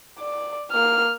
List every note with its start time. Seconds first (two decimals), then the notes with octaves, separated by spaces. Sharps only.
0.19 D5
0.72 A#3 F6